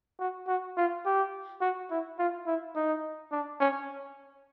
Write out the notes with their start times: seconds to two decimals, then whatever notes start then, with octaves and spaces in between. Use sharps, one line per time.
0.20 F#4
0.48 F#4
0.77 F4
1.06 G4
1.62 F#4
1.91 E4
2.19 F4
2.47 E4
2.76 D#4
3.32 D4
3.60 C#4